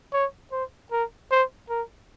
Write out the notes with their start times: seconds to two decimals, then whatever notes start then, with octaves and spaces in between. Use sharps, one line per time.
0.13 C#5
0.52 C5
0.92 A#4
1.31 C5
1.70 A#4